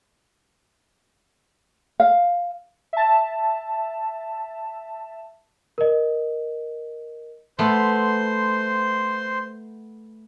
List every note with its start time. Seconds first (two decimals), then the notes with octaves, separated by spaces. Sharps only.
2.00 F5
2.93 E5 A5
5.78 A#4 D#5
7.59 A3 B3 C5 A5 C6